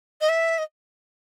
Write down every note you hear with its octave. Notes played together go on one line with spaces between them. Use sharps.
D#5
E5
D#5